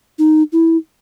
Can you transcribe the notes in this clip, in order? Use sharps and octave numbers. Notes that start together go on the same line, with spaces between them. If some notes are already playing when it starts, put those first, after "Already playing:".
D#4
E4